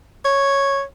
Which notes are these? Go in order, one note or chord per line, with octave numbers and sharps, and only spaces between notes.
C#5